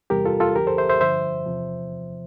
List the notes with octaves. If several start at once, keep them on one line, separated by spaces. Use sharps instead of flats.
E2 C3 G3 G4 A#4
F4 A4
F4 A4
D2 D3 F3 G4 A#4
A4 C5
C5 E5
C5 E5
G2 D3 F3 C5 E5
E2 C3 F3